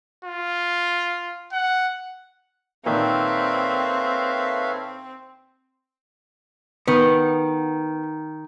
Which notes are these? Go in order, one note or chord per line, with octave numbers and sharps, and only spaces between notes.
F4
F#5
A#2 D#3 C4 A4 B4 C#5 E5 F5
D#3 B3